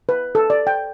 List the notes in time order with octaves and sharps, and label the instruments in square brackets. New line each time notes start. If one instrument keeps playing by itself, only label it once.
[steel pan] B4
A4
D5
G5